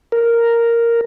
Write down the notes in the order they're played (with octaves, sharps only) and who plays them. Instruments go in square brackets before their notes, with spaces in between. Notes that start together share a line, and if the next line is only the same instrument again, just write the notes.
[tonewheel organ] A#4